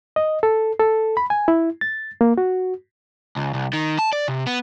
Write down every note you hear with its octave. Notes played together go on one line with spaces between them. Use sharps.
D#5
A4
A4
B5
G#5
E4
A6
A#3
F#4
C#2
C2
D#3
A5
D5
C3
B3